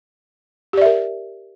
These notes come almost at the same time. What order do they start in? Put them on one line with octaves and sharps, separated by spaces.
G4 D5 E5 A#4